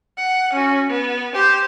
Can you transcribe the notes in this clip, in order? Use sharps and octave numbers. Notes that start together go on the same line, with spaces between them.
F#5
C#4 F#4
B3
G4 C5